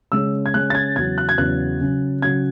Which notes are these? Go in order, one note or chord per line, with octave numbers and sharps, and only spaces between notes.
C#3 G#3 C#4 E6
G#6
C#3 G#3 C#4 F#6
A6
G#6
E2 C#3 F#3 G#6
F#6
G#6
E2 C#3 F#3 F#6
C#3 F#3 C#4
C#3 F#3 C#4 G#6